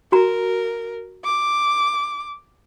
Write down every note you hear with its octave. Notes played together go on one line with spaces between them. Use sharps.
F#4 A#4 A#5
D6